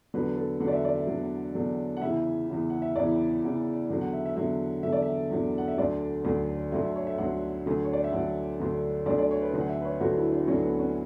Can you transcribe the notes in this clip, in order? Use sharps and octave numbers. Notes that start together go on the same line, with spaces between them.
E2 D3 F#3 B4
A4
E2 D3 F#3 F#5
D5
E5
D5
E5
E2 D3 F#3
E2 D3 F#3
F#5
E2 C#3 E3 E5
E2 C#3 E3
F#5
E5
E2 C#3 E3 D5
E2 C#3 E3
E2 D3 F#3
F#5
E5
E5
E2 D3 F#3 E5
E2 D3 F#3 E5
D5
E5
E2 D3 F#3
F#5
E5
D2 D3 F#3 D5
D2 D3 F#3
D2 D3 F#3 E5
E5
C#5
E5
D2 D3 F#3 F#5
D2 D3 F#3
C#5
D5
E5
D2 D3 F#3 F#5
D2 D3 F#3
D2 D3 F#3 D5
D5
C#5
B4
D2 D3 F#3
F#5
E5
B4
C#5
D2 D3 F#3 F#4
E4
D4
D2 D3 F#3 C#4
B3
C#4